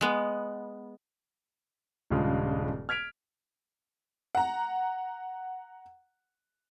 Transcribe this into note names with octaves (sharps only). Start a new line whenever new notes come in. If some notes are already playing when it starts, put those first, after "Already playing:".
G#3 B3
D#1 G2 C#3 G#3 F4
F6 G#6 B6 D7 F7
F#5 A#5